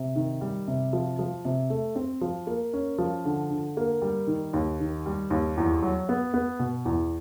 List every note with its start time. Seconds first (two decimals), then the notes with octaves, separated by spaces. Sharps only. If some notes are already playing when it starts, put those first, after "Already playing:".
Already playing: C3
0.16 D#3
0.41 G3
0.68 C3
0.93 F3
1.19 F3
1.45 C3
1.70 A3
1.96 C4
2.21 F3
2.47 A#3
2.73 C#4
2.98 F3
3.25 D3
3.51 D3
3.77 A#3
4.02 G3
4.27 D#3
4.53 D#2
4.80 D#3
5.06 G3
5.30 D#2
5.57 E2
5.82 F#3
6.09 B3
6.34 B3
6.59 B2
6.85 E2